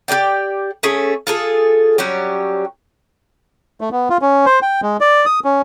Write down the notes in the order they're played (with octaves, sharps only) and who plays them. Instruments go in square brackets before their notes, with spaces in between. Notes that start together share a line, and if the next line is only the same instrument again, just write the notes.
[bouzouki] G4 G#4 D5 G5
A3 C#4 G#4
F4 G#4 A4
F#3 G3 C#4 G4
[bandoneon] A3
B3
F4
C#4
C5
G5
G#3
D5
D#6
C#4